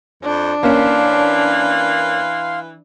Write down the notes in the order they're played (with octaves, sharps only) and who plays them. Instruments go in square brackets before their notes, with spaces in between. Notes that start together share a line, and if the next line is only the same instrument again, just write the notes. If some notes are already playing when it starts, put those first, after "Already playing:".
[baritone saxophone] F2 [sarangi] D4
[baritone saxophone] E3 [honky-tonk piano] A#3 C#4 [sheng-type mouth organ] F5 C6